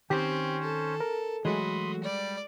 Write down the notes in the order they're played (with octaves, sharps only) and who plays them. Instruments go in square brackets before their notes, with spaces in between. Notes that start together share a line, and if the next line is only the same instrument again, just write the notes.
[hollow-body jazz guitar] D#3 [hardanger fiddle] C4 [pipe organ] C#4 C5 [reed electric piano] G4
[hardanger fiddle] A4
[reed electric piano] A#4
[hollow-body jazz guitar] E3 F#3 A3 [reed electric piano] G#3 [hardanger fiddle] F#4 [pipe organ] B5 C6 D#6
[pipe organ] G3 [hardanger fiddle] D5